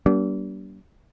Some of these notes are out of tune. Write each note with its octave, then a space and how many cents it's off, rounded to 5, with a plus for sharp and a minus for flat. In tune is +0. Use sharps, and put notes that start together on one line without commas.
G3 -40 A#3 +30 D4 -35